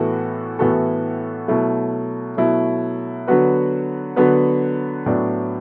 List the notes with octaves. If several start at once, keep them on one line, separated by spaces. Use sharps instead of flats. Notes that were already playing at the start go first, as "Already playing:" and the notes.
Already playing: A2 E3 B3 F#4 A4
A2 E3 B3 F#4 A4
B2 F#3 A3 E4
B2 F#3 A3 E4
D3 F#3 B3 F#4 B4
D3 F#3 B3 F#4 B4
A2 F#3 B3 D4